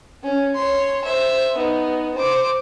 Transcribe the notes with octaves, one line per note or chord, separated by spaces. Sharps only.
C#4
C#5 C6
C5 E5
B3 D#4
C5 D6